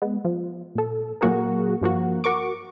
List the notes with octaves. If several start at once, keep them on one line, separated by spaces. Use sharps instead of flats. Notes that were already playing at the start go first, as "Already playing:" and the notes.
G#3 B3
F3
A#2 A4
A#2 F#3 A#3 F#4 G#4 A#4
G2 F3 A#3 F#4
F#4 A#4 C#6 D6